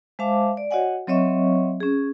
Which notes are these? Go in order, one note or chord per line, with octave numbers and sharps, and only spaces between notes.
G#3 C5 E5 F5 A5 D6
D5
F#4 C#5 D#5 F#5 G#5
F#3 C4 C#5 D#5 E5 C#6
C#4 G#4